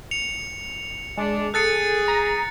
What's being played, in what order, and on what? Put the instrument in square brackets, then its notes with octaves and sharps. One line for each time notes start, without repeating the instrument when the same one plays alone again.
[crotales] C#7 F7
[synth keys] G#3 [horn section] D4
[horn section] G#4 [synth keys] A4 [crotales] F#6 A6 C#7
[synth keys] A#5